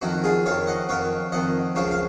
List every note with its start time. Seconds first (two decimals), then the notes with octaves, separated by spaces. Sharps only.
0.02 F2 D#3 D#4 F#4
0.24 F4 G#4
0.46 F2 D#3 C#5 F5
0.67 D#5 F#5
0.89 F2 D#3 C#5 F5
1.32 F2 D#3 D#5 F#5
1.75 C#2 C#3 F3 C#5 F5
1.91 F5